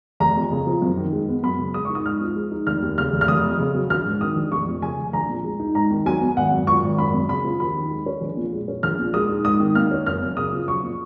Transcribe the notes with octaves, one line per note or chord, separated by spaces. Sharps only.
F1 A#5
F2
C#3
F3
F#2
D#3
G#3
B3
F#2 B5
C#3
G#3 D#6
D#4 C#6
D#6
G#2 F6
F3
G#3
D#4
F1 F6
D#2
C#3 F6
F1
F6
F1 D#6
F2
C#3
F#3
A#1 F6
G#2
D#3 D#6
A#1
F1 C#6
F2
C#3 G#5
F1
A#1 A#5
A#2
G#3
D#4
G#2 A#5
D#3
F#3 G#5
B3
G#1 F#5
F#2
F3 C#6
G#1
F#1 B5
F#2
C#3 B5
F3
D#2 B5
D#3
G#3
C#4
A#1
A#2
G#3
C#4
A#1 F6
A#2
G#3 D#6
D#4
G#2 D#6
D#3
A#3 F6
C#4
F#1 F6
F#2
C#3 D#6
F3
B1 C#6
A#2